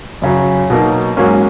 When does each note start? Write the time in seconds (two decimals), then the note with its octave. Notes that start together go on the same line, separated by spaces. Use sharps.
0.22 F#2 C#3 F#3
0.70 B2 F#3 A#3 D#4
1.17 G#2 F#3 A#3 C#4